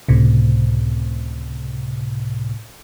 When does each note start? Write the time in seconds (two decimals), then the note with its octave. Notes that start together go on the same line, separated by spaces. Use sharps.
0.09 C#2 A2 C3